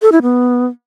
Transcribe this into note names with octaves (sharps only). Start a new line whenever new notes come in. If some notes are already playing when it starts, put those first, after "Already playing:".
A4
E4
B3